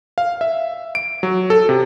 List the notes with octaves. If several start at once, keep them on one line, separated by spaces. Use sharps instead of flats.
F5
E5
D7
F#3
A4
C3